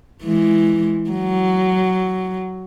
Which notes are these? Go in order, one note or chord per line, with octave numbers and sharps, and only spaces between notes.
E3 G#3
F#3